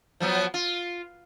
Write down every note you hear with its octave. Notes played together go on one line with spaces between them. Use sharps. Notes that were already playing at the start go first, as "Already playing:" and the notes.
F3 F#3 B3
F4